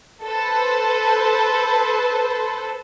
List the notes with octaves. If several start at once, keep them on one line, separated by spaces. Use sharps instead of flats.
A4 B4 C5